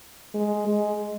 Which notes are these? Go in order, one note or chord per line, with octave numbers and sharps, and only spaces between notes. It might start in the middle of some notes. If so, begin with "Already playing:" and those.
G#3
G#3